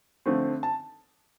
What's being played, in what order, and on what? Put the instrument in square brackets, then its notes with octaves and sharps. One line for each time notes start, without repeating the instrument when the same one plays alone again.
[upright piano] D3 F3 A3 C4
A5